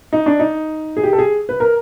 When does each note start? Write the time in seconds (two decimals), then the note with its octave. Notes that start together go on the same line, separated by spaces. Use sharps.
0.13 D#4
0.26 D4
0.39 D#4
0.97 G#4
1.03 G4
1.13 A4
1.19 G#4
1.49 B4
1.60 A#4